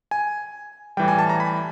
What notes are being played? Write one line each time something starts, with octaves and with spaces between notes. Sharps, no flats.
G#5
A2 E3 G3 G5
G#5
A5
A#5
B5